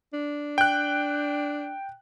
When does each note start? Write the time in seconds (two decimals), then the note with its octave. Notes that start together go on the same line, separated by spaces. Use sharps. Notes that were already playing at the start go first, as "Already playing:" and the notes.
0.14 D4
0.58 G5 F#6